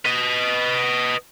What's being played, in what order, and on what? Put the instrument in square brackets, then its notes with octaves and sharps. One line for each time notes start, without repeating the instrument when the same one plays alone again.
[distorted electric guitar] B4 D#5